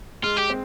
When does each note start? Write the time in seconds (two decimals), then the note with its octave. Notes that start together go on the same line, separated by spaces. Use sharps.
0.23 G#3 F4
0.37 G4
0.50 C4